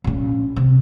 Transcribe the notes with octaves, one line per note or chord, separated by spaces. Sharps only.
A#1 C#4
C3